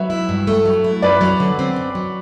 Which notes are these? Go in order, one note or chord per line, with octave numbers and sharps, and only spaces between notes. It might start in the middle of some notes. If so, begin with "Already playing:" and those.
Already playing: F#3 B4 E5
E4
G2
A3
F#3
E4
F#2 B4 D5
F#3
D3
C4
F#2
F#3